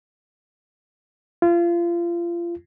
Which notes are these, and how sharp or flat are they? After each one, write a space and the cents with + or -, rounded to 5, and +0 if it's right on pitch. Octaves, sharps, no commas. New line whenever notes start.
F4 -30